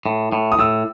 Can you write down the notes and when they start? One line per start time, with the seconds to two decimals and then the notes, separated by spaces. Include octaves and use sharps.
0.06 A2
0.32 A2
0.52 D#6
0.59 A2 E6